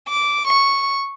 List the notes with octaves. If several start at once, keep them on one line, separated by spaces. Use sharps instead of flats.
D6
C#6